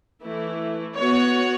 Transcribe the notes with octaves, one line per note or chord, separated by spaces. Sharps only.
E3 A3 E4
B3 F#4 C#5